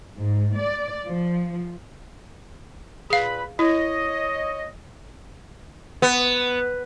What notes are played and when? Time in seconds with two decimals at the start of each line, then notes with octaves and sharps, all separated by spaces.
0.16 G#2
0.56 D5
1.07 F3
3.10 A#2 G#4 B4 F5 B5
3.59 E4 C#5 D#5
6.02 B3